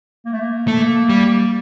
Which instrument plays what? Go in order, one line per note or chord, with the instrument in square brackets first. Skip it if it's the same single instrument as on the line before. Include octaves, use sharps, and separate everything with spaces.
[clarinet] A#3
A3
A#3
[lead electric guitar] A3
G3